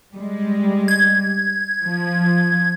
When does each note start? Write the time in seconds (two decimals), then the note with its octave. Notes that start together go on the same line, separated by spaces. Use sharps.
0.13 G3 G#3
0.88 G#6
1.83 F3